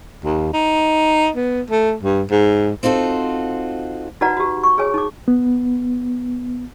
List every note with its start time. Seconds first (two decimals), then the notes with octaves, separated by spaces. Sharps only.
0.25 D#2
0.54 D#4
1.36 B3
1.70 A3
2.03 G2
2.31 G#2
2.83 C4 D#4 F4 F#4 A4
4.21 D#4 F#4 B4 D5 F#5 A#5
4.37 F#4 G4
4.63 C#6
4.78 G#4 C#5 G#5
4.94 D#4 D6
5.28 B3